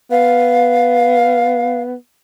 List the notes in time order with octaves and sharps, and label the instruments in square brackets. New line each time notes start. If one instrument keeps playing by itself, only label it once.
[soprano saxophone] B3 [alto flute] F5